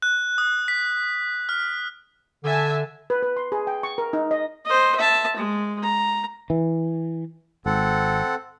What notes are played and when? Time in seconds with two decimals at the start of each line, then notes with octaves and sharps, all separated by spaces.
0.02 F#6
0.38 D#6
0.68 B6
1.49 F6
2.44 D3 E5 G#5 A5
3.10 B4
3.23 B4
3.37 C6
3.52 G#4
3.67 G5
3.83 C#6
3.98 A#4
4.13 D#4
4.31 D#5
4.65 C5 D#5
4.97 E5 A5
5.36 G#3
5.82 A#5
6.50 E3
7.66 G#1 C4 A4 F#5